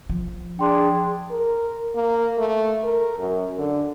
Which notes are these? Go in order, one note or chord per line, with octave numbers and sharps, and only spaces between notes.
F3
D4 G#4 G5 C6
A#4
A#3
A3
A#4
F#2
D3